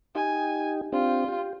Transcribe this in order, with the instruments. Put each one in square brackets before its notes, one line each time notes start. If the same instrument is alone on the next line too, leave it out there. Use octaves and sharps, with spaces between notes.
[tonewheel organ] D#4 G4 [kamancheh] G#5
[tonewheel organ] C4 D4 G4 [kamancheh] F4
[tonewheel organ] G4